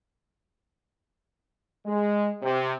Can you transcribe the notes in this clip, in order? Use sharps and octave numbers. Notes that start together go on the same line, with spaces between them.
G#3
C3